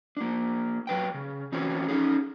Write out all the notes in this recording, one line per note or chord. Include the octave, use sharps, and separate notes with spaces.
A#3 D4
F#3 B4 G5
C#3
E3 C4 C#4 E4 F#4
C#4 D#4 G#4